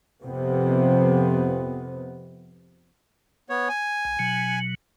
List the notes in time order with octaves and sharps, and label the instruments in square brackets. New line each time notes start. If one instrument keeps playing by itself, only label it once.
[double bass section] F2 C3 B3
[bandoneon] B3 C#5
G#5
[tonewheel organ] B1
B2 F#3